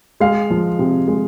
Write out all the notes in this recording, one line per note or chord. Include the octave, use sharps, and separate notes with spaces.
G#3 F5
F3
C3
G#3